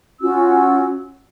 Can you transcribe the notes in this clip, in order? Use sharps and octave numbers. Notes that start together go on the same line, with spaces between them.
C#4 F4 F#4 E6